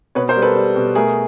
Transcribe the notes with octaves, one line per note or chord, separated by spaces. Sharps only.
B2 B4 C#5
A#4 C5
G3
A4 B4
G3
B2
A3 G#4 A#4